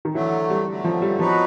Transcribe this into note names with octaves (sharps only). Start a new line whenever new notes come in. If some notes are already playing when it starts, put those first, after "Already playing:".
D#3
D3 E3 F#3 A3
G3
D3 F#3 A3
F3
G3
F3 F#3 B3 D#4 F#4 B4